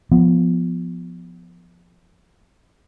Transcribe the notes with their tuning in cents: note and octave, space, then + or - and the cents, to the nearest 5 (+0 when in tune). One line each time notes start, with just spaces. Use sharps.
F3 +0 B3 +0